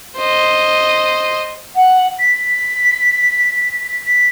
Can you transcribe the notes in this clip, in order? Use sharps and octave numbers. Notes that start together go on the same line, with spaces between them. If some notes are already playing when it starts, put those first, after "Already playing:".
C5 D#5
F#5
B6
B6